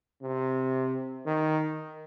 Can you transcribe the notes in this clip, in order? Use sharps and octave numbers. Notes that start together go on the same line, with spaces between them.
C3
D#3